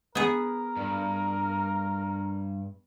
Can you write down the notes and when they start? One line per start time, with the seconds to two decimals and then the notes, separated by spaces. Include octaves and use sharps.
0.15 B3 G#4 A#4
0.77 G2